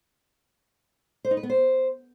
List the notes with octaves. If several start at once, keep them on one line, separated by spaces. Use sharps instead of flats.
C5
D#4
B4
B3
C5